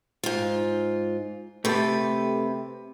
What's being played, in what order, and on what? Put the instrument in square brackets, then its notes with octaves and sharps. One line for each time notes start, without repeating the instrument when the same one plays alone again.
[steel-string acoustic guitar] G#2 F4
[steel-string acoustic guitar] C3 B4 [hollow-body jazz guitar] A3 G4 A4